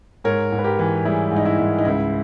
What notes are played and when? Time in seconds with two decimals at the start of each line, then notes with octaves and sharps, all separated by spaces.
0.24 G#2 A#4 C#5
0.52 G#2
0.59 B4
0.64 G4 A#4
0.79 E3
1.05 G3 E4 G#4
1.31 G#2 D#4
1.45 E4
1.59 G#2
1.78 D#4
1.85 C#2 E4